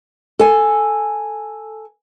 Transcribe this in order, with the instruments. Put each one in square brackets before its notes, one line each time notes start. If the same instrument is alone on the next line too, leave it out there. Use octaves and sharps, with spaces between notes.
[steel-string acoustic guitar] A4 G#5